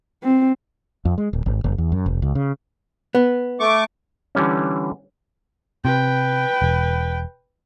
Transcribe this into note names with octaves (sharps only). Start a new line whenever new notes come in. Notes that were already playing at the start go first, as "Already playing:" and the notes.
C4
F2
G#3
D1
G#1
F#1
E2
F#2
F1
C#2
C#3
B3
A3 C#6 D6
D3 E3 G3 C#4
C3 B4 G5
E1